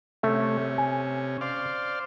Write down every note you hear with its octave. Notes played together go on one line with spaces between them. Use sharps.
C3 A3 C#4
G#5
C5 D5 F5